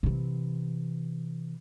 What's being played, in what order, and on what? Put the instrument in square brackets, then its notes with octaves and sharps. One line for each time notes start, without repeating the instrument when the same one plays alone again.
[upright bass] C3 E3